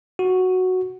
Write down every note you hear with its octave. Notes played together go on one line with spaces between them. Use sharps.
F#4